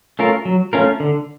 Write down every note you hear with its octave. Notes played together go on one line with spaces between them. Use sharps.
A3 C#4 F4 A#4
F#3
A3 C#4 F4 A#4
D3